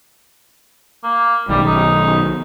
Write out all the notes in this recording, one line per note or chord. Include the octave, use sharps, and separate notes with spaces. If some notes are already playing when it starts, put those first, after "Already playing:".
A#3
B1 D#3 G3
D#4